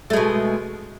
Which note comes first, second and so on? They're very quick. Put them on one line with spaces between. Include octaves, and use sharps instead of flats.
A3 G#3 B2